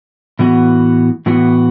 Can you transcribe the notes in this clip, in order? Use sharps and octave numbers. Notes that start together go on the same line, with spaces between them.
A2 E3 B3 F#4
A2 E3 B3 F#4